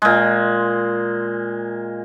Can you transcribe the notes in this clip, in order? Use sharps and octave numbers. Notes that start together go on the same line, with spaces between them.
A#2 G#3